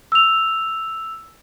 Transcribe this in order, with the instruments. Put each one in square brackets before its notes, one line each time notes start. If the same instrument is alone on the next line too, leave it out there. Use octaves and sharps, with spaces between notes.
[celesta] E6 F7